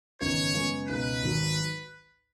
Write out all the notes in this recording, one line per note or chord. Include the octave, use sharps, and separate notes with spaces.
G#1 F#2 C#3 B3 D#4 C#5
F#2 C#3 G#3 B3
C#2 B2 B3 D#4 B4
G#1 G#2 D#3 F#3